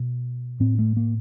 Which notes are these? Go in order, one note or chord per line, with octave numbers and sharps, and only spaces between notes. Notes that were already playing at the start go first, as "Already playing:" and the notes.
Already playing: B2
A2 C4
A3
A#3